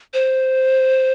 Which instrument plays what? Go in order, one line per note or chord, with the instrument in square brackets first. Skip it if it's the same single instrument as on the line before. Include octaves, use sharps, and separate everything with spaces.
[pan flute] C5